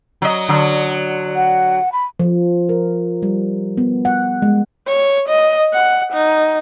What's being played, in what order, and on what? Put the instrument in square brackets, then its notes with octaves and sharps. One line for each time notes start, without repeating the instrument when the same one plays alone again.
[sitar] F#3 D#5
D3 F#3
[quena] F#5
B5
[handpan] F3
A#4
G3
B3
F#5
G#3
[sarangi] C#5
D#5
F#5
D#4